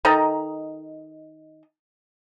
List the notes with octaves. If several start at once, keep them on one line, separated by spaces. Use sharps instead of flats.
D#3 A4 D#5 A#5